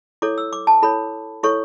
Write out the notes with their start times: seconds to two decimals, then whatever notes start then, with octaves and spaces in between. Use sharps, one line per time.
0.22 E4 A4 C#5 D6
0.38 E6
0.53 D6
0.67 A5
0.82 E4 A4 C#5 B5
1.43 E4 A4 C#5 C#6